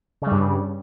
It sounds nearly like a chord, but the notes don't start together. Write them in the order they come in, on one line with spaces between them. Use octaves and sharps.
C#3 G3 G2